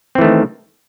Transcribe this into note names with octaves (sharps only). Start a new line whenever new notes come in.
D#3 E3 A3 C4